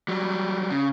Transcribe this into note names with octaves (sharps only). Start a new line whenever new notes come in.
F#3 G3
C#3